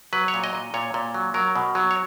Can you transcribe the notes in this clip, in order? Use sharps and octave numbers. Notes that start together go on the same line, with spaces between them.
F#3 B4
C#5
A#2
D#5
A#2
A#2 C#5
A#2
F#3
F#3 A#4
B2
F#3
C#5